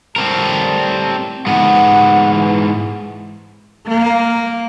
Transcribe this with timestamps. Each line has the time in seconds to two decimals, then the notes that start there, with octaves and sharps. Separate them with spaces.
0.16 A2 G3 C4 A#4 A5
1.47 G#2 B3 F#5
2.34 E3
3.88 A#3